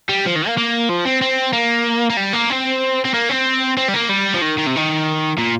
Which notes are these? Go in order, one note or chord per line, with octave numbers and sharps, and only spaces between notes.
G3
F3
D#3
A#3
A#3
F3
C4
C4
A#3
A#3
G3
A#3
C4
C4
A#3
C4
C4
G3
A#3
G3
F3
D#3
D#3
C3
D#3
A#2